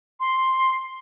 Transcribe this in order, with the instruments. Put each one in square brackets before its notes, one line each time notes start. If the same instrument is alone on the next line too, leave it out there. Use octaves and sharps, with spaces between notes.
[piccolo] C6